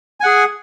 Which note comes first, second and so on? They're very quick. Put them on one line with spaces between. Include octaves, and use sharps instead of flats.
G#5 F#5 G#4